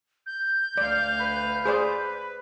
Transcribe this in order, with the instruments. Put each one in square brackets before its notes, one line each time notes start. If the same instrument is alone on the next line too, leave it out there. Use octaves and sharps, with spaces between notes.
[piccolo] G6
[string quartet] D2 F5 [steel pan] D5
[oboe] B4
[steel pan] G#4 C5 D5 [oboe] B4